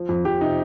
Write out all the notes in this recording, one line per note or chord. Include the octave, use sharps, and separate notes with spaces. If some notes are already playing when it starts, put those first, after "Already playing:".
Already playing: F3
F2
F2 G4
C3 D#4